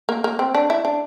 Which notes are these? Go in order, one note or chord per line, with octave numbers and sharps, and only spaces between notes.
A#3
A#3
C4
D4
E4
D4